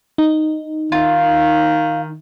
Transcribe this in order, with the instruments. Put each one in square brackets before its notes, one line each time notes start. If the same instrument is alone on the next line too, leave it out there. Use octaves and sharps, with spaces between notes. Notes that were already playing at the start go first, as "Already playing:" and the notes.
[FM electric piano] D#4
[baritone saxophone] D#3 [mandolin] F4